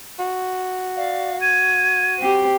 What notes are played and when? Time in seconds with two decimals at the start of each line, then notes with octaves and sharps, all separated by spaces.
0.19 F#4
0.96 D5 F5
1.41 G#6 D#7
2.19 C4 G4